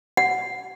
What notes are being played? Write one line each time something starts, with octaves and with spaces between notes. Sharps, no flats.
F#5